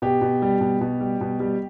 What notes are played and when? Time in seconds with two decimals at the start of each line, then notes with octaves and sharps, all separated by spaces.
0.02 B2 G4
0.21 B2
0.42 G3
0.61 B2
0.81 B2
1.01 G3
1.21 B2
1.40 G3